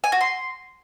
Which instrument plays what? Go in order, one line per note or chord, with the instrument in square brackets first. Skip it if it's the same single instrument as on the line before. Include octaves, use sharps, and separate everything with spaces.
[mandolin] G#5
F#4
C6